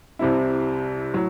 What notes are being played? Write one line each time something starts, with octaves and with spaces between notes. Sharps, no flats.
C2 C3 G3 C4 E4
A2 F#3